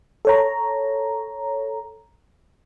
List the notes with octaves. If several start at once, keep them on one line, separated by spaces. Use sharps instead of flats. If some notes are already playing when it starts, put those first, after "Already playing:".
A4 C#5 A#5